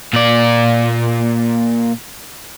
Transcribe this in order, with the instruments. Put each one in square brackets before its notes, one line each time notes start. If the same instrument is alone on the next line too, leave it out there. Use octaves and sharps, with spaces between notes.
[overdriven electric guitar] A#2 D5